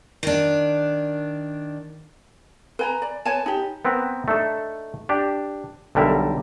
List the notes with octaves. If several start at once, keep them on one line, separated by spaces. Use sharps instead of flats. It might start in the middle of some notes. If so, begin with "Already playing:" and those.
D#3 D4
B4 G#5 A#5
D5
B4 C#5 G#5 A5
D#4 G4
B3 C4 A#4 B4
A3 D4 D#4 A4
D4 G4
B1 D3 G3 A#4 E5